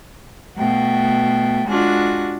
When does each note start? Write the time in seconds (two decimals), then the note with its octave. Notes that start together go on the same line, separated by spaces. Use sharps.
0.57 B2 A3 F#4 G5
1.68 G#3 D4 F4 F#4 F#6